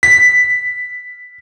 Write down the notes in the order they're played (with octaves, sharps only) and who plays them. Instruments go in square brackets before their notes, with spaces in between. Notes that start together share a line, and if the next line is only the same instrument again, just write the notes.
[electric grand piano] B6